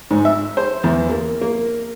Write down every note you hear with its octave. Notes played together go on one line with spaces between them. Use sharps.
G#2
E5
C5
E2
A#3
A#3